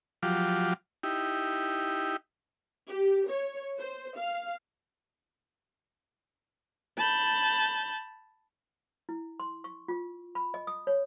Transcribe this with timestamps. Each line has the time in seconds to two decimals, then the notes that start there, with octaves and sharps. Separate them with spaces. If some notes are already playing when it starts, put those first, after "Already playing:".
0.23 F3 F#3 F4 G4 D6
1.03 D#4 E4 G4
2.90 G4
3.29 C#5
3.78 C5
4.17 F5
6.97 A5 B5 G6
9.09 E4
9.40 C6
9.64 C#6
9.88 F4
10.35 B5
10.54 D#5
10.67 D#6
10.87 C#5